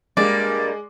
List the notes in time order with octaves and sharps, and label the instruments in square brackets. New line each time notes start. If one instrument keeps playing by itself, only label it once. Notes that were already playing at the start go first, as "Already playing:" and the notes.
[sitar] G2 G3 A#3 [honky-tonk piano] G#3 [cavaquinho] D5